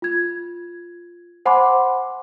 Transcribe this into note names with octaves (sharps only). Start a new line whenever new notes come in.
F4 G#6
C5 F#5 G#5 B5 C6 D6